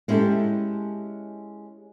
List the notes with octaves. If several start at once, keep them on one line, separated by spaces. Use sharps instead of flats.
G#3 C#4 E4 G4 A4